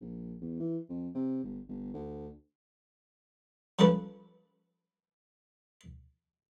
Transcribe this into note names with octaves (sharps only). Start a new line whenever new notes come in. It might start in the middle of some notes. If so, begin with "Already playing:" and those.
A#1
E2
E3
F2
C3
G1
G1
D2
F3 G3 C#4 A4 B4